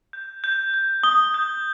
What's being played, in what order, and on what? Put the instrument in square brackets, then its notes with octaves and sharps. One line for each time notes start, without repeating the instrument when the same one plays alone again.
[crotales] G6
G6
G6
[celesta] D#6 [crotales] G7
[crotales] G6